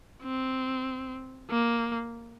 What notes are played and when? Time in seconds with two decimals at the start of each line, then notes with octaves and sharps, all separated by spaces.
0.23 C4
1.50 A#3